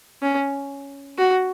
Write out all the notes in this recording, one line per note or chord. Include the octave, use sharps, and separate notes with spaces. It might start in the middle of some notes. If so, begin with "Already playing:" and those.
C#4
F#4